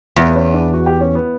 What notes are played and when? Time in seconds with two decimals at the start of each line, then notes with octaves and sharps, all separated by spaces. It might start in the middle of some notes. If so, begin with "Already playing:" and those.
0.16 E2 B3
0.35 C#4
0.54 D4
0.73 F#4
0.86 G4
1.01 C#4
1.15 B3